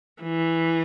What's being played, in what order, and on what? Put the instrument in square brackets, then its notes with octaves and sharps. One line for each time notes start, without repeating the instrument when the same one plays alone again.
[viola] E3